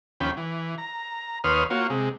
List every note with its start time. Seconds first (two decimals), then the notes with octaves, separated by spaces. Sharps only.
0.20 D#2 F3 C#4 G5 B5
0.37 E3
0.78 A#5
1.44 D#2 B4 C#5 C6 D#6 F6
1.70 A#3 F4 F#4 C#5
1.90 C3 G#3